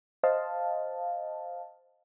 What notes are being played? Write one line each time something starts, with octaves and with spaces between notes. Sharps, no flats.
C5 D#5 F5 A5